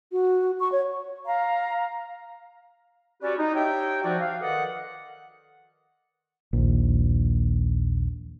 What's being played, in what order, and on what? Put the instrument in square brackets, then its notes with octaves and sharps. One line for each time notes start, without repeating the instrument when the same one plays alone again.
[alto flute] F#4
C#6
C#5
[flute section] F5 A#5
[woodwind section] C#4 F#4 G4 B4 C#5 D5
D#4
D#4 G4 C#5 E5 G5
F3 F#4 D5
F5
D#3 A4 B4 D5 D#5 F#5
[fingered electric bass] A#1 D#2